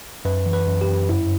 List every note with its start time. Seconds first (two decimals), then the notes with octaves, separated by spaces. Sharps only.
0.25 F#2 B4
0.46 E3
0.53 B4
0.67 F#2
0.81 G4
0.88 F#2
1.09 G2 E4